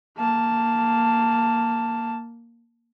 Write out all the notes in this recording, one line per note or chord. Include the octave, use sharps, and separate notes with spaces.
A#3 A5